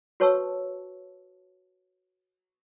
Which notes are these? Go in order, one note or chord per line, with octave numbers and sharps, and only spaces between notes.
F#4 B4 C#5 A5 C#6 E6